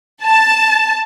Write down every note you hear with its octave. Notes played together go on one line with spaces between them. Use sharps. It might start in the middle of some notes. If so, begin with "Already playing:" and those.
A5